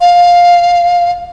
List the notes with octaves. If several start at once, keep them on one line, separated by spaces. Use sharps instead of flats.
F5